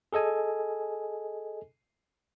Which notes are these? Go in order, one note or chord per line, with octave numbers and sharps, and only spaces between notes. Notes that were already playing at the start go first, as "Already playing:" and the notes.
G#4 A4 D#5 G#5